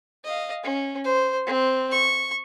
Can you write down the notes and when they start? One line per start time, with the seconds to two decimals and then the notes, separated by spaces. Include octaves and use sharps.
0.24 D#5 F5
0.63 C#4
1.04 C5
1.47 C4
1.92 C#6